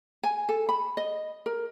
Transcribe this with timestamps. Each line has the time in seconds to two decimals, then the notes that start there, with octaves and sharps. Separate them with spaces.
0.23 G#5
0.49 A4
0.69 B5
0.97 D#5
1.46 A#4